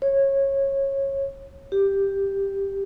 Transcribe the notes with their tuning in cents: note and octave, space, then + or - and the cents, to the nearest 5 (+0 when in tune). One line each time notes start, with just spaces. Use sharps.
C#5 -20
G4 +5